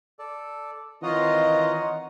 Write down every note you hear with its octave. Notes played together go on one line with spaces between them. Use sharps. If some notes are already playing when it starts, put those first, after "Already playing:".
A4 D5
D#3 E3 C4 D#4 F4 C#5 D#5 F#5